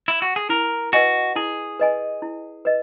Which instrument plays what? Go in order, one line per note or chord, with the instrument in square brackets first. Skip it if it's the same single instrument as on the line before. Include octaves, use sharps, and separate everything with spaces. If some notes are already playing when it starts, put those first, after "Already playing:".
[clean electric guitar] E4
F#4
G#4
[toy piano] E4 [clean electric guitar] A#4
[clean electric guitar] F#4 [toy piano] B4 D#5 G#5
[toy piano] E4 [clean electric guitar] G#4
[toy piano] B4 D#5 G#5
E4
B4 D#5